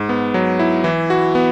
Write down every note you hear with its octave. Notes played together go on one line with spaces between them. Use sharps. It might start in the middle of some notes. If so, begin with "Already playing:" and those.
Already playing: G#2
B3
F#3
E4
E3
F#4
B3